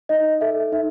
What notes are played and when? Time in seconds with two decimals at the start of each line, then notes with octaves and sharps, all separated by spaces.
0.09 D#4 D#5
0.41 A4 E5
0.72 D#4 E5